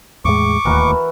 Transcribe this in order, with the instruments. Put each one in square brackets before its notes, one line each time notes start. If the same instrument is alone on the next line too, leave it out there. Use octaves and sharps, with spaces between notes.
[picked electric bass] E2 A2 G#3 [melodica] C#6 D6
[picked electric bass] D1 D#2 A2 [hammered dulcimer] E3 F#4 A#4